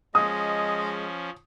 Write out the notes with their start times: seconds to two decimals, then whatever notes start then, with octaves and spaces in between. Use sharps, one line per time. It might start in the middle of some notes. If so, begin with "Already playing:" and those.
0.15 F3 G#3 C#4 D#5 D#6